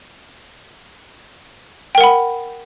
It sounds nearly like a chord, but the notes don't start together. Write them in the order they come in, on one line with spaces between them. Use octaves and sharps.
G5 A#4 F#5 B5